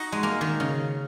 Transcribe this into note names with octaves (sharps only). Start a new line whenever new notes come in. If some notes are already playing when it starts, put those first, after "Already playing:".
Already playing: D#4 F#4
G#3
A#3
D#3
C#3